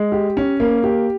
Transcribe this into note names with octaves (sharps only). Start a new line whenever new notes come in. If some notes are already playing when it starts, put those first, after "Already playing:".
Already playing: G#3
G4
C#4
A#3
G4